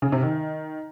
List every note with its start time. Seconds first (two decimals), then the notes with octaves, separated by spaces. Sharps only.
0.02 C#3
0.12 C3
0.23 D#3